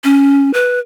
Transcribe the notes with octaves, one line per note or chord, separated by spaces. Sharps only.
C#4
B4